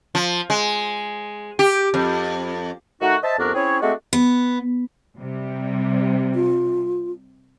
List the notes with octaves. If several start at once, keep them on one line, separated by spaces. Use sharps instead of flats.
F3
G#3
G4
F2
D#3 A3 D#4 F#4
C5 D#5 E5 A5
C2 F2 B3 D4 F#4 A#4
C4 C#4 E4 G#4 C#5
G#3 A3 C4 D4 F#4
B3
C3 G3
F4